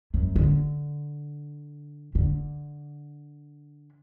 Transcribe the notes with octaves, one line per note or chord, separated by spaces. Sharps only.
F#2
D3
D3